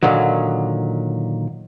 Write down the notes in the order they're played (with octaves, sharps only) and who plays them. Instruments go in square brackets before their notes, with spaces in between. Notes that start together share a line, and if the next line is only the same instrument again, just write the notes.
[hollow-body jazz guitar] A#2 D3 D#3 F#3